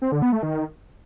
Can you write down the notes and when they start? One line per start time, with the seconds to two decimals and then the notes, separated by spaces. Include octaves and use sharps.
0.02 C4
0.12 D3
0.22 B3
0.32 A3
0.43 D#3